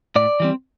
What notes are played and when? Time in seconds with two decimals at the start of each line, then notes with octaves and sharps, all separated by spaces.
0.16 A2 D5
0.40 E3 G3 C4